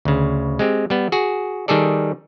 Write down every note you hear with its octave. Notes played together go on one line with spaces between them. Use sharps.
D2 C#3
G#3 C4 G4
G3 B3
F#4 G#4
D#3 G3 G#4 A4 D5